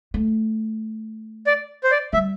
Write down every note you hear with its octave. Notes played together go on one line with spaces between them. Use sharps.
A3
D5
C5
D5
G3 E5